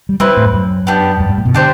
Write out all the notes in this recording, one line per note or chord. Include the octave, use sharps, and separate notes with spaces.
G3
G3 C4 E4 B4
A2
G2
F#2
B3 D4 G4
F#2
G2
A2
B2
D3 D4 G4 C5